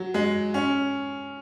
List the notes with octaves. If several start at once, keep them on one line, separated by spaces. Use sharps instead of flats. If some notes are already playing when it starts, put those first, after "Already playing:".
Already playing: F#3
G#3
C#4